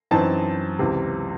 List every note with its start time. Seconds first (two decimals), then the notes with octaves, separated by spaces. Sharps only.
0.11 F#2 E3 C4 D#4 A5
0.79 C#2 C3 E3